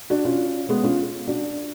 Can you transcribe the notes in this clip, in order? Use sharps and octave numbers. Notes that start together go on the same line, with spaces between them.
D4 F#4
C#4 F4
G#3 B3
C#4 F4
D4 F#4